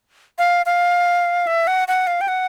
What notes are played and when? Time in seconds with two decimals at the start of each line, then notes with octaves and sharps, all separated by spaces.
0.38 F5
0.66 F5
1.47 E5
1.67 F#5
1.88 F#5
2.07 F5
2.21 G5
2.28 F#5